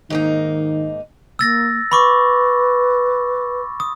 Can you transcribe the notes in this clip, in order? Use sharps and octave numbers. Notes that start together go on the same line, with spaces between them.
G#2 D#3 A#3 D#4
A#3 E6 A6 A#6
B4 B5 C#6 D6
D#6